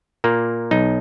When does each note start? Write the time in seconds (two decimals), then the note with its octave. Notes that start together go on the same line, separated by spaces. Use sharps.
0.24 A#2 A#3
0.71 B1 D#4